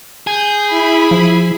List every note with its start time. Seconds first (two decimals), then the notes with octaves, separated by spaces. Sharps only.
0.27 G#4 G6
0.66 E4 B5
1.11 F3